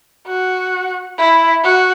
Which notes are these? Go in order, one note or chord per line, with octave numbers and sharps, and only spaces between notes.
F#4
E4
F#4